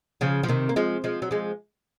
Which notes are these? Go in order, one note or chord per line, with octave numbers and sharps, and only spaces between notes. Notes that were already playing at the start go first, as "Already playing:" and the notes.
C#3 F3
F3
C3 D#3
A#3
F3 G#3
F3 G#3
F#3
F3 G#3